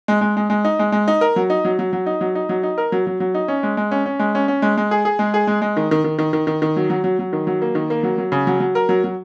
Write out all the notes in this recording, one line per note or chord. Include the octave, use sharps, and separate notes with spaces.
G#3
G#3
G#3
G#3
D#4
G#3
G#3
D#4
A#4
F#3
D#4
F#3
F#3
F#3
D#4
F#3
D#4
F#3
D#4
A#4
F#3
F#3
F#3
D#4
C#4
G#3
G#3
C#4
C#4
G#3
C#4
C#4
G#3
G#3
G#4
G#4
G#3
G#4
G#3
G#3
D#3
D#3
D#3
D#3
D#3
D#3
D#3
F#3
F#3
F#3
F#3
D#3
F#3
A#3
D#3
A#3
F#3
F#3
C#3
F#3
F#3
A#4
F#3
F#3